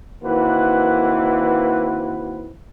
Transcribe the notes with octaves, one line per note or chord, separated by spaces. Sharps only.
D#3 E3 A#3 C4 F#4 B4